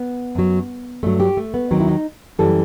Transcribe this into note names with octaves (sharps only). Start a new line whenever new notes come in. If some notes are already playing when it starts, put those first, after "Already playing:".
Already playing: B3
F#2 F#3
G2 F#3 A3
G4
A3
B3
D#2 D#3 F#3 C4
E4
D#4
F#2 E3 G3 A4